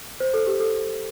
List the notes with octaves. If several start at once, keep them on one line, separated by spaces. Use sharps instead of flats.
C5
A4
G4
A4